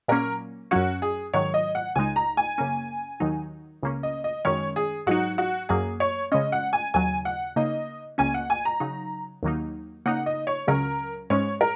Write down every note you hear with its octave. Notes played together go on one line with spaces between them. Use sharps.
A#2 F#3 A#3 C#4 A#4
F#2 F#3 C#4 F#4
G#4
G#2 D#3 F#3 C#5
D#5
F#5
C#2 C#3 G#3 D#4 G#5
A#5
G#5
F#2 C#3 A#3 C#4
D#2 D#3 F#3 D#4
C#2 C#3 A#3 C#4
D#5
D#5
F#2 D#3 G#3 C#4 C#5
G#4
G#2 F#3 D#4 F#4
F#4
F#2 F#3 A#3 G#4
C#5
C#3 G#3 C#4 D#5
F#5
G#5
D#2 C#3 F#3 G#5
F#5
C#3 A#3 D#4 D#5
C#2 C#3 A#3 C#4 G#5
F#5
G#5
A#5
C#3 F#3 D#4
D#2 D#3 F#3 A#3 D#4
C#3 A#3 D#4 F#5
D#5
C#5
C#2 C#3 F#3 C#4 A#4
G#2 G#3 C#4 C#5
A#4